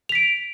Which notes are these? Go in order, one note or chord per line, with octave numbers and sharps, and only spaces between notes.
B6 D7 F7